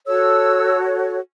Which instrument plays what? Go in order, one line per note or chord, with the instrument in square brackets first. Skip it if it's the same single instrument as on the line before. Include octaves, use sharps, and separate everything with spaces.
[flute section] F#4 A4 C#5 E6